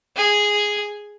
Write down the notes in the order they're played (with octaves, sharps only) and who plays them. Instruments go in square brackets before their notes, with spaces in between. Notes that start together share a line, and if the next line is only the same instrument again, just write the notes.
[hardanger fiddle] G#4